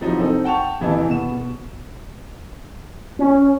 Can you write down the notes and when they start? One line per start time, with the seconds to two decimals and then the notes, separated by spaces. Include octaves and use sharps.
0.01 C3 F3 F#3 D#4 E4
0.19 C4 D#4 A4
0.44 F#5 G5 A5 C#6 F7
0.80 D#1 C3 E3 E4 D#5 A5
1.07 B2 B3 E7
1.32 B2
3.19 C#4